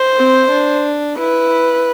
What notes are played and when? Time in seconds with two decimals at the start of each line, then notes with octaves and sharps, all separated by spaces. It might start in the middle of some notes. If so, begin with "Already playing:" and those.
Already playing: C5
0.18 C4
0.52 D4
1.18 E4 B4